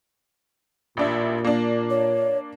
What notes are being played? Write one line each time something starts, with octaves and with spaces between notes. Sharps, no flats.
A1 A#2 D4 E5
A#3 D4
C#5